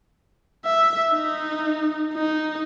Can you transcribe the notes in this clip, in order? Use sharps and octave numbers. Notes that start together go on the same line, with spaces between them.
E5
D#4
D#4